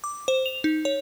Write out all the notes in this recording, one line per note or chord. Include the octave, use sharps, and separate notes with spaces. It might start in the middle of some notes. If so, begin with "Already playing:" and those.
D6
C5
F7
D#4
C#5